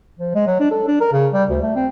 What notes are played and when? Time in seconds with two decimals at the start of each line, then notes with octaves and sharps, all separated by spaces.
0.19 F3
0.35 G#3
0.47 F#3
0.60 D4
0.71 A4
0.88 D4
1.01 A#4
1.12 C#3
1.33 G3
1.50 D2
1.62 A3
1.75 C4